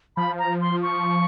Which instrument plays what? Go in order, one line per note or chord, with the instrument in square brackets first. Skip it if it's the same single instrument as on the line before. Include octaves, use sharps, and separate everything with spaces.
[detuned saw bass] F3 [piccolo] B5
[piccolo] A#5
C6
C#6